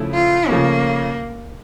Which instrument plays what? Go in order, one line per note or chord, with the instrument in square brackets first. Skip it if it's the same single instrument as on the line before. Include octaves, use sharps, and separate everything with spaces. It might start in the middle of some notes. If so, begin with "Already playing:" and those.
Already playing: [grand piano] C#3 F3 A3 E4
[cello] F4
[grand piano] C#3 F3 A3 C#4 [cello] A#3